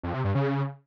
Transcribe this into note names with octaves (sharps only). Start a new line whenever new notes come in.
F2
C3
G2
C#3